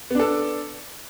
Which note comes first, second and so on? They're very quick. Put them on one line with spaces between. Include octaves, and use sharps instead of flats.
B3 D4 A4